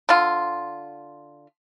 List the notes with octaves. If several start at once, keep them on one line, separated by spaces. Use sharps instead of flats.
D3 F4